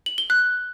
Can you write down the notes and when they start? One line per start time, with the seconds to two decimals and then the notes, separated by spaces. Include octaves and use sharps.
0.06 F#7
0.18 G7
0.30 F#6